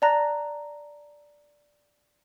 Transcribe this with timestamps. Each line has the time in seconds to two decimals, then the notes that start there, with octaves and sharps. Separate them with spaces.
0.02 D5 A5 A#5 F#6 A#6